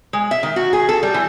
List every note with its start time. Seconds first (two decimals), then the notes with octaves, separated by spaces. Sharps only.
0.13 G#3
0.31 E5
0.43 D#3
0.56 F#4
0.73 G#4
0.89 A4
1.03 G3
1.14 E3